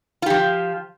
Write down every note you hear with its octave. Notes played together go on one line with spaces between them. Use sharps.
F3 F4 G4